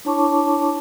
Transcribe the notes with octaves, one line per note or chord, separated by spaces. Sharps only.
D4 E4 C#5 A5 C#6 D6